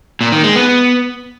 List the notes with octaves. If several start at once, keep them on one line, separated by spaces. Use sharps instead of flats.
A#2
D#3
G#3
B3